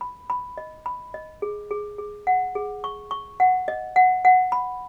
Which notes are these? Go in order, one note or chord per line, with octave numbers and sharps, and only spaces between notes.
B5
B5
D#5
B5
D#5
G#4
G#4
G#4
F#5
G#4
C#6
C#6
F#5
D#5
F#5
F#5
B5